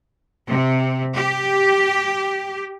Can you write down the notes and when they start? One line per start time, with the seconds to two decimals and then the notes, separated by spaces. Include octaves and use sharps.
0.49 C3
1.15 G4